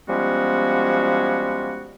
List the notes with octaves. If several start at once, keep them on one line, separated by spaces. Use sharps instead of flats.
F3 G3 G#3 B3 C#4 F#4